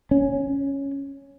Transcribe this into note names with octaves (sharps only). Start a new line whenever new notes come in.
C#4